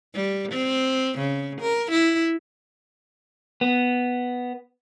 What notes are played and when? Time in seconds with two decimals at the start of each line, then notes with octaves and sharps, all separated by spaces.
0.15 G3
0.52 C4
1.18 C#3
1.61 A#4
1.91 E4
3.61 B3